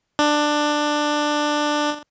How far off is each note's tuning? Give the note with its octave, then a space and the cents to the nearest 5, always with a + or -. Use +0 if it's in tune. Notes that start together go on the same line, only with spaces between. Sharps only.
D4 +15